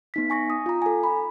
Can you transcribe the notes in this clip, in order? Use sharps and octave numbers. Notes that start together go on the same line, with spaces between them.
B3 D#4 B6
G#5 C#6 A#6
D#6
F4 A#5
A4 G#5
B5